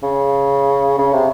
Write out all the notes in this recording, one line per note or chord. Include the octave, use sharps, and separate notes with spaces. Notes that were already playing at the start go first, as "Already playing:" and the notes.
C#3
C#3
C3